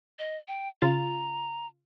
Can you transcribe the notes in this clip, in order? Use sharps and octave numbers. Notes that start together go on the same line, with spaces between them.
D#5
G5
C#3 F4 A#5 A6